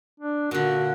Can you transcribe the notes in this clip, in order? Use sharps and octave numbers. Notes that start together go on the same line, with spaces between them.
D4
A#2 D3 F#4